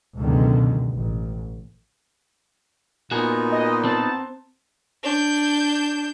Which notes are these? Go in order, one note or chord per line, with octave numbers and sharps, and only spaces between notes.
C#2 F#2 B2 D3 D#3
A1
A#2 B3 D#4 F#4 G#5
D#5
C4 A5
D4 G6